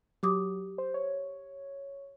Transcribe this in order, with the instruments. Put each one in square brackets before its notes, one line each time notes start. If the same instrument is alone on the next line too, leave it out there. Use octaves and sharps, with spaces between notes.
[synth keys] F#3 [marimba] G4 D6 D#6
[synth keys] C5
C#5